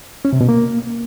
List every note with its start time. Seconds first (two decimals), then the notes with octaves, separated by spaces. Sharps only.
0.25 C#4
0.33 C3
0.41 B2
0.49 A#3